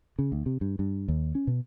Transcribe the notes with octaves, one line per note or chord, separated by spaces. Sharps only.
C#3
D2
C3
G2
G2
D#2
C#4
B2